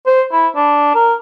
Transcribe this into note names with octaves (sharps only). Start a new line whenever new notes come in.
C5
E4
D4
A#4